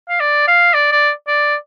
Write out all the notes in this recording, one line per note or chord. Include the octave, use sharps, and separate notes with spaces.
F5
D5
F5
D5
D5
D5